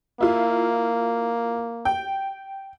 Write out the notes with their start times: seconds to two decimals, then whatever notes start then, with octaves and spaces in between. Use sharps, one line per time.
0.21 A#3 E4 F4
1.85 G5